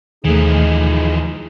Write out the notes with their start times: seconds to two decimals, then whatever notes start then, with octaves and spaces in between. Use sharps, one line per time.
0.24 D#2 E3 F3 A3 D#4 G#4